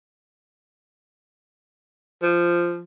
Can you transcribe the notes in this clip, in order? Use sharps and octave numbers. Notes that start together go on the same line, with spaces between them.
F3